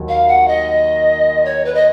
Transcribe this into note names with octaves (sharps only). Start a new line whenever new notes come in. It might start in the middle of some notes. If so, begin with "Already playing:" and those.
Already playing: D#2 F#3
F5
F#5
D#5
C#5
B4
D#5